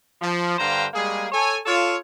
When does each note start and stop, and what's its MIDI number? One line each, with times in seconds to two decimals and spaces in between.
0.21 0.58 53
0.58 0.86 43
0.58 0.86 50
0.58 0.86 72
0.58 0.86 77
0.58 0.86 79
0.58 0.86 82
0.94 1.26 55
0.94 1.26 56
0.94 1.26 58
0.94 1.26 68
1.32 1.58 69
1.32 1.58 73
1.32 1.58 80
1.66 1.95 65
1.66 1.95 69
1.66 1.95 73